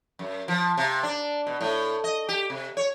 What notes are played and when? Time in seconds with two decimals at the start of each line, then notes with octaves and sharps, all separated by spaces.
0.19 F#2
0.48 F3
0.77 C3
1.03 D4
1.47 B2
1.61 A2
2.04 D#5
2.29 G4
2.50 C3
2.77 C#5